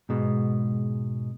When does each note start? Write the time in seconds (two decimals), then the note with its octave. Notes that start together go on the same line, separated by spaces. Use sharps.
0.09 G#2 B2 G#3